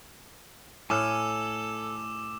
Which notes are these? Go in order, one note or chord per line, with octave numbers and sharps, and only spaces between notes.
A2 A4 G#5 D6 E6 F6 E7